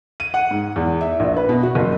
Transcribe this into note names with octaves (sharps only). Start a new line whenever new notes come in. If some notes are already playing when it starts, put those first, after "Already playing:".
D#7
F#5
G#2
E2
E5
A#1
B4
B2
F#4
F#1